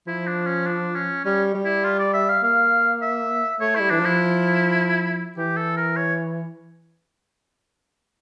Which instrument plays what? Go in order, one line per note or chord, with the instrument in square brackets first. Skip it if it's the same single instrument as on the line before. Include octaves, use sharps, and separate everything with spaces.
[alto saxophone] F3 [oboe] E4
[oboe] D4
C#4
D4
C#4
[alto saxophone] G3 [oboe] C#4
[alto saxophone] G3
[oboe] E4
F4
D5
E5
F5
[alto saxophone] A#3 [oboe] F5
[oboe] E5
[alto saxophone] A3 [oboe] C#5
[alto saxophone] G3 [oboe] E4
[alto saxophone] E3 [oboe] D4
[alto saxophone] F3
[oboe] E4
[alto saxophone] E3 [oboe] G4
[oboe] A4
A#4
C#5